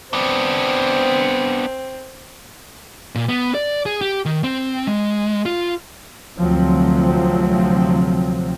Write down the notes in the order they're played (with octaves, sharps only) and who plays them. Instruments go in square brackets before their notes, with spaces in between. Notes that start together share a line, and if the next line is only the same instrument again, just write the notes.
[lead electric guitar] B3 D4 [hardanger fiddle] C4
[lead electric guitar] A#2
B3
D5
G#4
G4
D#3
C4
G#3
F4
[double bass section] D2 C3 F3 F#3 C4